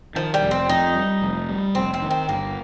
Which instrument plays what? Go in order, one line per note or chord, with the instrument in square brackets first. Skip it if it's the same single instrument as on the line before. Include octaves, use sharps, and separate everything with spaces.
[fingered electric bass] D#3 [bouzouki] F3
[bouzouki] G3
[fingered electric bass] F1
[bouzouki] C4
[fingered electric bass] F2 [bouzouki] D#4
[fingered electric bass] G3
F1
G3
[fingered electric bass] F1 [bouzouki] C4
[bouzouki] C4
[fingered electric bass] D#3
[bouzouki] C4
[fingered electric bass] G1 [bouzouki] A#3